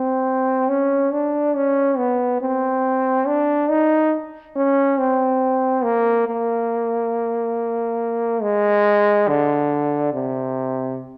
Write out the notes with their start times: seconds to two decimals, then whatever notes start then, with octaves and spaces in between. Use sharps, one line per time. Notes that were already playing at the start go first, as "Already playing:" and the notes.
Already playing: C4
0.69 C#4
1.13 D4
1.56 C#4
1.98 B3
2.41 C4
3.27 D4
3.70 D#4
4.56 C#4
4.98 C4
5.84 A#3
6.27 A#3
8.42 G#3
9.28 D3
10.13 C3